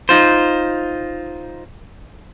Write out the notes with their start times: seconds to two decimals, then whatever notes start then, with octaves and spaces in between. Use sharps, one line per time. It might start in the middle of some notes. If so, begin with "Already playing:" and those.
0.09 D#4 F4 C5